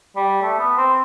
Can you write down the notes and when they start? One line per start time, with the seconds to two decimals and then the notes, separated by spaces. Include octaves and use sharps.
0.16 G3
0.43 A3
0.59 B3
0.77 C4